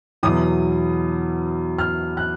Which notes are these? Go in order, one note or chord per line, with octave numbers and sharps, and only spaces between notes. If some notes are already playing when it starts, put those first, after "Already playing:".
E2 B2 F#3 D#6
F6
F#6